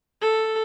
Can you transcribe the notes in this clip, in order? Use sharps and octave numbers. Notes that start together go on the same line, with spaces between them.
A4